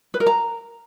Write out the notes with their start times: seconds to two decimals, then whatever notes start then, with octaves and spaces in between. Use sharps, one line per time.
0.14 B4
0.20 A#4
0.27 A#5